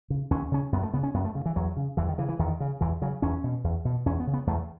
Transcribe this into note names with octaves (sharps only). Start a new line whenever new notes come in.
C#3
D#2 C#4
C#3 C#4
F#2 B3
A3
C#3 B3
C#4
F#2 B3
A3
C#3
E3
E2 F#3
C#3
E2 E3
D#3
C#3 E3
E3
E2 D#3
C#3
E2 E3
C#3 F#3
E2 C#4
B2
E2
B2
E2 C#4
B3
C#3
B3
E2 A3